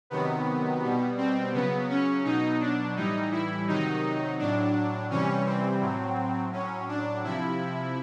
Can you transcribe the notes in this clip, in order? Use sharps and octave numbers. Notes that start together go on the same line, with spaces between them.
C3 D#3 F#3 B3
B2 G3
C4
C#3 F#3 B3
C#4
B2 F#3 D#4
D4
A2 E3 G3 D#4
E4
C3 D#3 F#3 D#4
A2 F#3 D4
C3 E3 G3 C#4
C4
A2 F#3
A2 F#3 C#4
D4
C3 F3 E4